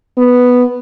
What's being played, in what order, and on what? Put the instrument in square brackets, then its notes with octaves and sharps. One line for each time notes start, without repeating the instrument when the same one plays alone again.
[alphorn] B3